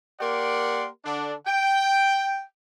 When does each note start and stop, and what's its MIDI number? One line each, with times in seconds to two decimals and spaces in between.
0.20 0.87 58
0.20 0.87 67
0.20 0.87 70
0.20 0.87 74
0.20 0.87 78
0.20 0.87 84
1.04 1.34 50
1.04 1.34 62
1.46 2.43 79